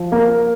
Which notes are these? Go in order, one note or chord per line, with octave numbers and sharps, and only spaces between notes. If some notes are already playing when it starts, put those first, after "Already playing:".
Already playing: F3
A#3